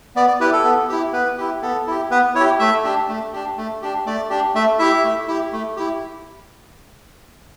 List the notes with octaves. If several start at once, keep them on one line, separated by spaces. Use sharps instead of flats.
B3 D5
D5
E4 G4 B4
A4
B3
E4 G4
B3 B4
E4 G4
B3 A4
E4 G4
B3 B4
E4 C#5
G4
A3 E5
D4 G4
A3
D4 G4
A3
D4 G4
A3 D5
D4 G4
A3 E5
E4 G4 E5
A3
E4 G4
A3
E4 G4